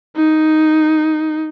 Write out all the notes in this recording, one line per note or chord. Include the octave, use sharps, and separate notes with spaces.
D#4